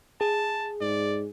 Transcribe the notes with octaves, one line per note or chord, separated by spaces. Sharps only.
G#4 A5
G#2 D5